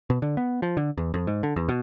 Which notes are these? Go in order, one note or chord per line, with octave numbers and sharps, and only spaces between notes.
B2
D3
B3
F3
D3
E2
F2
G#2
D3
E2
B2